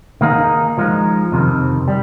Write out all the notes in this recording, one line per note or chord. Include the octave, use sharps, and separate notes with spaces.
D#3 A#3 D#4 G#4
F3 G#3 D#4
F2 C3 D#3
G3